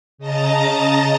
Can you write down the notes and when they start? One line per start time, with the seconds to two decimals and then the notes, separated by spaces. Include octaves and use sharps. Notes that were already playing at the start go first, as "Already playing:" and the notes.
0.18 C#3 D#5 A5 A#5 A6